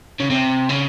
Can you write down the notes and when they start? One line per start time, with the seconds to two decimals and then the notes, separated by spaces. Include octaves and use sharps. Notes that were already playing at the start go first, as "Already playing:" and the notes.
0.20 C#3
0.30 C3
0.69 C#3